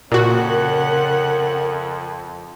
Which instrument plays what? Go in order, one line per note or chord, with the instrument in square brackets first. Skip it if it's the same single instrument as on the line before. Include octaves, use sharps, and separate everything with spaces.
[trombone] F2 [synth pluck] A#2 F#4 [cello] C#3 F#5 [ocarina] A#4